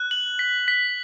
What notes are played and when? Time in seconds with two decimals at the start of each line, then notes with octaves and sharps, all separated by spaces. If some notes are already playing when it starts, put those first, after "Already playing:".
Already playing: F#6
0.11 F#7
0.39 B6
0.68 B6